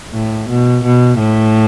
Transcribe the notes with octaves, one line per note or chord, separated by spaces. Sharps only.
A2
B2
B2
A2